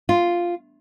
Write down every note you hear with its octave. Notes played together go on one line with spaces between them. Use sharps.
F4